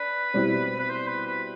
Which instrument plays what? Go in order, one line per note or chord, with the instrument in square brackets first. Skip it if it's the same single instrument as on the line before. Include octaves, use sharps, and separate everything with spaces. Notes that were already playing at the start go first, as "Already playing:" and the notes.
Already playing: [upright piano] D4 [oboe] B4
[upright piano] B2 G3 C4 E4 G4
[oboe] B4
C5
B4
B4